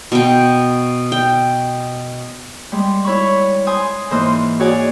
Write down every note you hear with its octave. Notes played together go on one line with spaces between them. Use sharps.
B2 G5
G5
G3 G#3
E4 C#5 B5 C#6
C5 G#5 D#6
G#2 E3 A#3 C5 D#5
F#4 G#4 C#5 D5 G#5